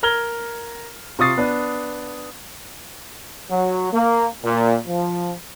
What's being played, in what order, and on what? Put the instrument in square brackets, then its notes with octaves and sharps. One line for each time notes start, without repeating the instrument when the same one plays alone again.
[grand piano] A#4 A#5 F6 G#6 G7
C3 F4 C#6 D#6 A6 C7
B3 D4
[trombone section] F#3
A#3
A#2
F3